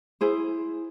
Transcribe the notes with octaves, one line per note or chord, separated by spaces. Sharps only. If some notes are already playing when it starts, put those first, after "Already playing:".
E4 G#4 C5